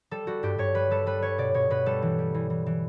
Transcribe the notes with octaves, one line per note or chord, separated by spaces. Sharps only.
G3 A4
G3 F#4
G2 G4
G2 C#5
G3 B4
G3 A4
G3 B4
G3 C#5
B2 D5
B2 C#5
B2 B4
G3 A4
E3
G3
E3
E3
E3